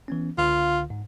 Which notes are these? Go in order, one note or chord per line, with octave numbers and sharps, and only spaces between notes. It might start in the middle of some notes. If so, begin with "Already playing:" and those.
E3 B3 C#4
C#2 D3 F4 F5
G#2